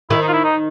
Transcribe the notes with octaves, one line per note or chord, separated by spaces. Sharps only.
D#3 E4
D#4
F4
E4
D#4